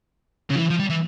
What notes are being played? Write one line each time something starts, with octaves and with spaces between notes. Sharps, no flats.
C#3
F3
E3
F3
G3
E3